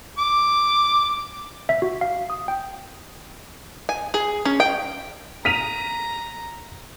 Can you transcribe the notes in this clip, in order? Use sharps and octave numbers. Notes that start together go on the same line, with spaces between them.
D6
E5
F#4
F5
D#6
G5
G#5
G#4
C#4
G5
A#5 B6 D#7 F7